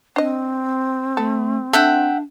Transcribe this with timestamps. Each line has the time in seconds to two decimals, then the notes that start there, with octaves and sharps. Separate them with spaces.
0.16 C4 D4 D#5
1.17 A3 A4
1.73 D4 A4 E5 F#5 G5